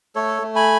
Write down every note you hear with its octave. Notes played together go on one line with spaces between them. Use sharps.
A3 A4 C#5
A3
G#5 B5